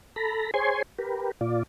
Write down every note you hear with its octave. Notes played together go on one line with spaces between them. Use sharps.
A4 A#5 B5
G#4 C5 C#5 G#5 C6
G4 A#4 B4
A#2 F4 D5